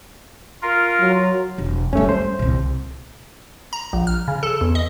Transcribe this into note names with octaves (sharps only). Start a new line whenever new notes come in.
F4 A#4
F#3
E1 D4
F#2 G3 A3 C#4
C5
C2 A#2
A#5
A#1
F6
C#3
A4
E2
D#5